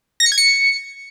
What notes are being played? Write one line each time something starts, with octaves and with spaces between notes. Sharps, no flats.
A#6
C#7
G#6
C#7